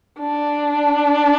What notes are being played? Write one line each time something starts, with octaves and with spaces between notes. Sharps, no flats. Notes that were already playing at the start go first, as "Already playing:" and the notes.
D4